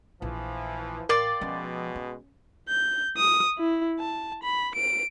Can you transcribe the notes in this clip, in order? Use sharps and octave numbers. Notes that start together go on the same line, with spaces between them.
A#1 E3 F3
A1 F4 A#4 D5 G5
B2 F3 G#3 C#4
C#4
G6
D#6
E4
A5
B5
D7